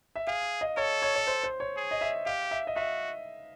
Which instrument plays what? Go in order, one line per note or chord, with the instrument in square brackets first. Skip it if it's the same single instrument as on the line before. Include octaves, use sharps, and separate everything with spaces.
[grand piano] E5
[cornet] G#4 [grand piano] F5
[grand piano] D#5
[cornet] A4 [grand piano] C#5
[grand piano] C#5
C#5
C5
C5
C#5
[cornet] G#4
[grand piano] D#5
E5
[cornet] G4 [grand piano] F5
[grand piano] E5
D#5
[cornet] F#4 [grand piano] E5